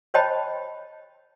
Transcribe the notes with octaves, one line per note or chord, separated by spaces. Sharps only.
C5 C#5 D#5 G5 A5 B5